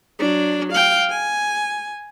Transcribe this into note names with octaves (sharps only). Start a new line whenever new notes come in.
F#3 D4
F5 G5
G#5